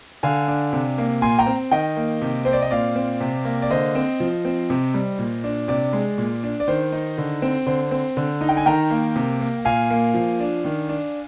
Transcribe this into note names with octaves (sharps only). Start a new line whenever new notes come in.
D3 F5 G#5
D4
C3
A#3
A#2 G#5 C6
G5 A#5
C4
D#3 D#5 G5
A#3
C3
C4 C5
D5
D#5
A#2 D5 F5
C4
C3
A#3
D5
D3 C5 D#5
C4
F3
C4
C3
G3
A#2
D4
C3 D5
G#3
A#2
D4
D5
D#3 C5
D#4
D3
C4
D3 C5
C4
D3
D#4
G5
G#5
D#3 G5 A#5
A#3
C3
A#3
A#2 F5 G#5
A#3
F3
D4
D#3
D4